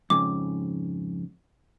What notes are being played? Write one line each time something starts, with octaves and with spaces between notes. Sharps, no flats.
F2 G#2 C#3 D6